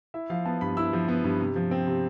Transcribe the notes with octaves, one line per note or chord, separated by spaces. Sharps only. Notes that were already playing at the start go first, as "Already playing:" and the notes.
E4 E5
F3 F5
B3 A5
G2 B5
E4 E6
F3
B3
G2
C3
F3
C4
C3